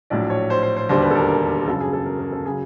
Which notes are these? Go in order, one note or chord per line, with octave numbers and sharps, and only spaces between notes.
A#1 A2 F#3 D5
C#5
C5
C5
C5
E1 D#2 D3 G3 C5
B4
A4
A#4
A#4
G1 F#2 C#3 F#3 A4
G#4
A4
A#4
A#4
A4
C#3 F#3 G#4